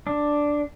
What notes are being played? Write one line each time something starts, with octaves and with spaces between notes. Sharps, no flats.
D4